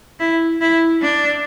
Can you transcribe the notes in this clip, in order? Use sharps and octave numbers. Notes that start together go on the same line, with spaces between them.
E4
E4
D4